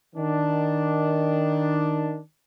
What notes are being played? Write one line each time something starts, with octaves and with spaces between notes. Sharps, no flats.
D#3 D4